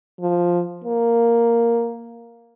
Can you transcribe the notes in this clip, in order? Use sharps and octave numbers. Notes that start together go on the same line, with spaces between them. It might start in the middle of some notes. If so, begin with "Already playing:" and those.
F3
A#3